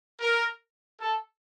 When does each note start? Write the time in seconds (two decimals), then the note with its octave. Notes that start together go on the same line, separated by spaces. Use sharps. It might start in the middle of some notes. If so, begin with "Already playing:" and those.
0.21 A#4
1.00 A4